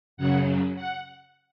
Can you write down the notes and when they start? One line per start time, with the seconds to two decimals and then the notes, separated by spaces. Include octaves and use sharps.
0.17 F#2 C#3 F#3 F#5
0.76 F#5